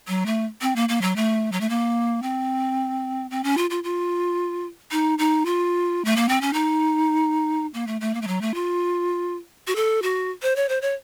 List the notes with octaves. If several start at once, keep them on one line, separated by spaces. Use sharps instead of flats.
F#3
A3
C4
A#3
A#3
F#3
A3
F#3
A3
A#3
C4
C4
C#4
F4
F4
F4
D#4
D#4
F4
A3
A#3
C4
C#4
D#4
A#3
A3
A3
A#3
A3
F#3
A3
F4
F#4
A4
F#4
C5
C#5
C5
C#5